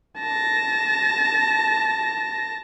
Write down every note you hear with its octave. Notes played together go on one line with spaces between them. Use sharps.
A5 A#6